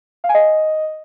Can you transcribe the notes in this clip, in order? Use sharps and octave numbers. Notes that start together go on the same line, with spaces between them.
F5
G#5
D#5